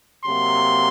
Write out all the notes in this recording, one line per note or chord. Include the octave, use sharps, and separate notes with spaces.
C3 F#3 A#3 C6